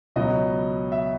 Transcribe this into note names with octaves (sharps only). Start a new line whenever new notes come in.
C#2 B2 F#3 D#5
E5